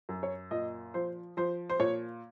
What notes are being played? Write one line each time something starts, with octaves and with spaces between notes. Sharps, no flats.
F#2
C#5
A#2 D#5
F3 C5
F3 C5
C5
A#2 C#5